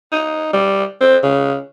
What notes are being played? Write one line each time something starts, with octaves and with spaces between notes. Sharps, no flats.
D#4
G3
C4
C#3